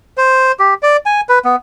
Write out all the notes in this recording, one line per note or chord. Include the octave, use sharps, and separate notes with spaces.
C5
G4
D5
G#5
B4
B3